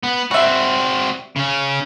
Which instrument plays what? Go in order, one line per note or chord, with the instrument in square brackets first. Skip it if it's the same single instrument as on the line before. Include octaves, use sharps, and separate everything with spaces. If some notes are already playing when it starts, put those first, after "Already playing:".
[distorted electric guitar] B3
[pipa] G3 E5 [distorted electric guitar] C4 F#4
[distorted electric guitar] C#3 C#4